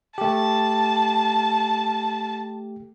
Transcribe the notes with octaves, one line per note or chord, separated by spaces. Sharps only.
A3 G4 A5